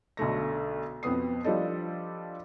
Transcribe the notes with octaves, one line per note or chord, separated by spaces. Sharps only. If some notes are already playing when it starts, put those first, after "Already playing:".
B1 D3 A3 A#6
F2 B2 B3 D#6 C7
F3 G3 D4 A4 D#5